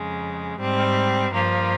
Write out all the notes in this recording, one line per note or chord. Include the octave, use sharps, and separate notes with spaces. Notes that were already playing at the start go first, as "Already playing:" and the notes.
Already playing: F2 C#3 G#3
G#2 G3 C4
G2 F3 A#3